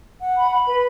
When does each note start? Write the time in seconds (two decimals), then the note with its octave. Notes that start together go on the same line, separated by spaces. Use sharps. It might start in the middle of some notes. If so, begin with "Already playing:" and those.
0.21 F#5
0.37 B5
0.52 B5
0.67 B4